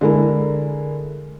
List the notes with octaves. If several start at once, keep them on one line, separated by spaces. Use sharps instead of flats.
D3 G#3 E4 A#4